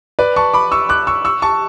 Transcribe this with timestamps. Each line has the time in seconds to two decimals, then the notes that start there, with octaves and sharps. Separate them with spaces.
0.19 B4 D5
0.36 A5 C#6
0.54 B5 D6
0.72 C#6 E6
0.89 D6 F#6
1.07 C#6 E6
1.25 C#6 E6
1.42 A5 C#6